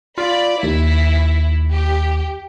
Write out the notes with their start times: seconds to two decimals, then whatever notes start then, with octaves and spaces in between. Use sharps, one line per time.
0.18 F4 D5 B5
0.63 D#2 E4
1.73 G4